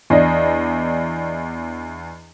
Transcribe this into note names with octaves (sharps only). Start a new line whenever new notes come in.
E2 D4 D#5